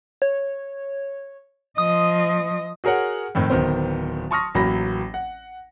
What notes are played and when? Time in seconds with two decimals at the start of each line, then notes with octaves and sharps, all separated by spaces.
0.22 C#5
1.78 F3 D#5 D#6
2.84 F#4 G#4 A#4 C#5 F#5
3.35 F2 A2 D#3 C4
3.50 D1 D#3 B3 C5
4.31 A5 C6 C#6 D#6 F6 A#6
4.55 A1 F#3 A#3 B5 A#6
5.14 F#5